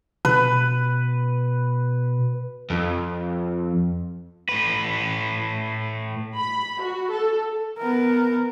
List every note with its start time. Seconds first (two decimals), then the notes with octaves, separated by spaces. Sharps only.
0.25 B2 B4
2.70 F2
4.49 A2 B4
6.36 B5
6.82 F#4
7.12 A4
7.78 B3 A#4